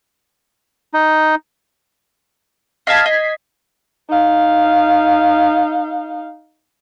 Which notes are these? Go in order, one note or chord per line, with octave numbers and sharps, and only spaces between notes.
D#4
D#5 F5 A5 G#6 B6 C7
D#5
D#4 F5